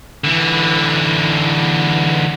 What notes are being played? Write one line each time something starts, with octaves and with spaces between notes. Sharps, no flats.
D3 E3